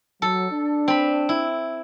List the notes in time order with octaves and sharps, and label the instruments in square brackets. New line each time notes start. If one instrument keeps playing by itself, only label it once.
[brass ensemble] F#3 [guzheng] A4
[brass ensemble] D4
[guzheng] C4 B5
E4